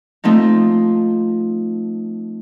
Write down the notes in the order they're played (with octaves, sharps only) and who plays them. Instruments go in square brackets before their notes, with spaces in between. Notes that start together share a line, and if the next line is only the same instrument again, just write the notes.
[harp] F3 A3 C4 D#4